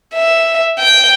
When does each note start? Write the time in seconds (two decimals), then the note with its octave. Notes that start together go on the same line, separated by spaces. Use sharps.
0.15 E5
0.79 G5